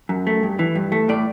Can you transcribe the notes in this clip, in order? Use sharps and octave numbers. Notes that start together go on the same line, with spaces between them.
F#2
A3
G2
E3
G2
A3
A2 D5